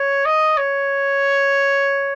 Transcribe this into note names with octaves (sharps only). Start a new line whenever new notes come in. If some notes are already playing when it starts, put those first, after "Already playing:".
Already playing: C#5
D#5
C#5